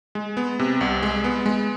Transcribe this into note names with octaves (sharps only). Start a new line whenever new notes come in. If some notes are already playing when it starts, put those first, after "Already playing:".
G#3
B3
C3
C2
G#3
B3
G#3